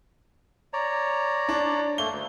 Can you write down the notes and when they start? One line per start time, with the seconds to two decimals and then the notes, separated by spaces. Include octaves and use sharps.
0.73 C#5 D5 A#5
1.49 D4
1.98 A3 A#3 G7
2.11 D2